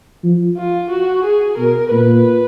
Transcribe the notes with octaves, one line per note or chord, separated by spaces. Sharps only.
F3
F4
F#4
G#4
B2 A#4
A#2 B4